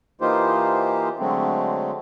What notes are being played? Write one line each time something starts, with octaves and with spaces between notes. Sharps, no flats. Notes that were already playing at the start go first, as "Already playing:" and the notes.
E3 A#3 D#4 F4 G4 C5
D3 F#3 G#3 A3 C4